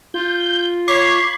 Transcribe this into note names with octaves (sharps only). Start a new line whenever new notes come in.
F4 G6
C#5 B5 D6 G#6 C7